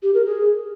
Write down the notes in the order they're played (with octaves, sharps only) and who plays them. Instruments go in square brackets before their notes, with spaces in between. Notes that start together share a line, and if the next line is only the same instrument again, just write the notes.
[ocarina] G4
A#4
G#4